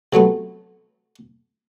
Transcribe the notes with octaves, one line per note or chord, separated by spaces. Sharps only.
C3 F#3 A3 B3